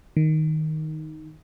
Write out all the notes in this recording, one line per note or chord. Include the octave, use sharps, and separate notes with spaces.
D#3